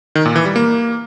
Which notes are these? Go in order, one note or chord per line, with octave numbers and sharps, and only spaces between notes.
D#3
A#2
E3
G3
A#3